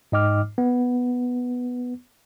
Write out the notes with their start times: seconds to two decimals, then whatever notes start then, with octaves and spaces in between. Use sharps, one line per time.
0.12 G#2 D#4 D#5 G5 D6 F6
0.58 B3